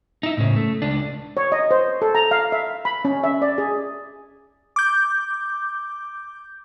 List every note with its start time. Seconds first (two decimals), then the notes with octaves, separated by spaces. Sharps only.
0.23 D#4 E4
0.37 A2 C#3
0.56 A3
0.82 C#2 D4
1.37 C#5
1.52 D#5
1.71 C5
2.02 A4
2.15 A#5
2.31 F5
2.52 E5
2.85 B5
3.05 C#4
3.24 E5
3.42 D5
3.58 G#4
4.76 D6 G6